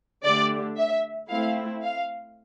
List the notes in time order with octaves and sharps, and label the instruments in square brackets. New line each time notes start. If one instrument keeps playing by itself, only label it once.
[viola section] D3 A3 D4 G4 [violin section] D5
[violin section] E5
[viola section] A3 C4 E4 [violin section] F5
[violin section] F5